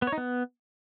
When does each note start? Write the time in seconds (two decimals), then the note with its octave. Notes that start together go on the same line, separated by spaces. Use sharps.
0.02 B3
0.07 C#5
0.12 D#4
0.18 B3